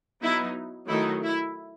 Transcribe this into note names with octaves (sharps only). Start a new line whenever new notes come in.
F#3 B3 D#4 E4
D#3 F#3 A3 D#4 E4
E4